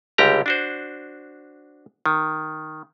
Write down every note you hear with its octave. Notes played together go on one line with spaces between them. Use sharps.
C#2 D3 G3 G4 A#5
D4 F#4 C5
D#3